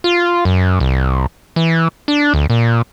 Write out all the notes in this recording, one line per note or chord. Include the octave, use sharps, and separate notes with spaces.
F4
F#2
C2
E3
D4
D2
A#2